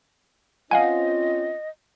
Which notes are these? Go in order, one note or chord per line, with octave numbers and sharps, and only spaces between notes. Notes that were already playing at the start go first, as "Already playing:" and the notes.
C4 C#4 F4 D#5 F5 F#5 G#5